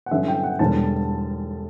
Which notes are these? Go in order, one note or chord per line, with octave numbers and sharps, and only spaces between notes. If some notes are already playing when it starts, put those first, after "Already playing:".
F#5
G2 D3 F#3 C#4 E4 E5
G5
F#5
E1 E2 D3 G3 A5